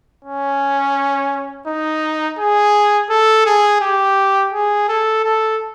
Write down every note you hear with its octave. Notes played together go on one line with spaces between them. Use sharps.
C#4
D#4
G#4
A4
G#4
G4
G#4
A4
A4